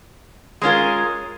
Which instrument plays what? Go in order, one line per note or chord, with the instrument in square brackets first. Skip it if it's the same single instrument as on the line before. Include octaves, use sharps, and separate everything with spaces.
[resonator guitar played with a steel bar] G#3 C#4 F4 A#4